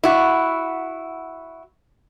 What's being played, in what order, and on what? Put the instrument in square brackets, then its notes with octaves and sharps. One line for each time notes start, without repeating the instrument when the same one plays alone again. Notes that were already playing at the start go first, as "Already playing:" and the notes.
[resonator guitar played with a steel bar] E4 F#4